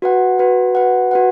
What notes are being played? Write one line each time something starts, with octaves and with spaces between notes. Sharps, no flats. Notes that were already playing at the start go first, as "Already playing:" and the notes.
F#4 B4 F#5
F#4 B4 F#5
F#4 B4 F#5
F#4 B4 F#5